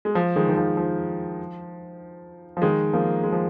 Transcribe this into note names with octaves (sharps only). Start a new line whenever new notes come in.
G#3
F3
D#3 G#3
D#3
F3
F3
F3
D#3 G#3
F3 A#3
G#3
F3